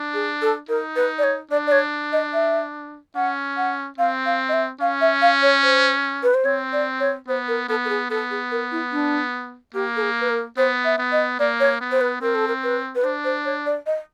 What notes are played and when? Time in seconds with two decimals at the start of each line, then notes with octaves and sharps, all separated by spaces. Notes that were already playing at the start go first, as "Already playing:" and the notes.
Already playing: D4
0.14 G#4
0.42 A4
0.69 D#4 A#4
0.96 B4
1.18 D5
1.23 C#5
1.51 D4 D5
1.67 D5
1.72 C#5
2.12 D#5
2.33 E5
3.16 C#4 F#5
3.57 F#5
3.98 C4 F5
4.26 F5
4.49 D#5
4.53 E5
4.80 C#4 F5
5.01 E5
5.22 F5
5.42 C#5
5.63 C5
6.23 B4
6.34 C5
6.45 C4 C#5
6.73 D5
7.00 C#5
7.27 B3 C5
7.48 A#4
7.68 B3 A4
7.85 A4
7.89 G#4
8.10 B3 A4
8.30 G#4
8.51 A#4
8.72 E4
8.92 D4
9.74 A#3 G4
9.96 A4
10.02 G#4
10.20 B4
10.30 A#4
10.57 B3 C5
10.85 E5
10.98 B3
11.12 D#5
11.39 A#3 D5
11.60 C#5
11.81 B3
11.92 C5
12.01 B4
12.22 C4 A#4
12.35 A4
12.48 A#4
12.63 B4
12.95 B4
13.04 D4 C5
13.24 C5
13.45 C#5
13.66 D5
13.86 D#5